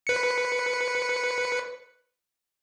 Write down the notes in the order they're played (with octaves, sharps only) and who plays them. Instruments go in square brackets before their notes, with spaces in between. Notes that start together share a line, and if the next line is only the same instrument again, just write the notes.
[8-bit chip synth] B4 C#7